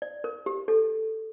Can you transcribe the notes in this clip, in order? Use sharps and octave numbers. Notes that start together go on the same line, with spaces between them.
D5
A#4
G4
A4